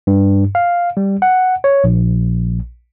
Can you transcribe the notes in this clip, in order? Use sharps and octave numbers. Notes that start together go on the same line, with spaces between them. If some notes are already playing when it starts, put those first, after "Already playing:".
G2
F5
G3
F#5
C#5
A#1